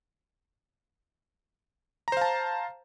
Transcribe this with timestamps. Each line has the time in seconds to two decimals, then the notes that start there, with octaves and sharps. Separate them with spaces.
2.08 A#5
2.12 C5
2.17 F5
2.21 A5